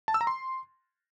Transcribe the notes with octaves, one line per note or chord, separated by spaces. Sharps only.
A5
E6
A#5
C6